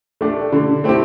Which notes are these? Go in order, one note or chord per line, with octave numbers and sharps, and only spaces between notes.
A3 D4 G4
D3
A3 C4 E4 G4